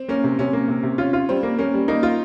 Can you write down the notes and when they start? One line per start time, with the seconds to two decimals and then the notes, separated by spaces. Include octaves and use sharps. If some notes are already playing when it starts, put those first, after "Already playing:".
Already playing: C4
0.09 A#3 C#4
0.24 C3
0.39 C3 C#4
0.53 A#3
0.68 C3
0.83 C3
0.98 C#4 F4
1.13 F4
1.29 G3 C4
1.43 A#3
1.58 A#3 C#4
1.74 G3
1.88 A#3 D#4
2.03 F4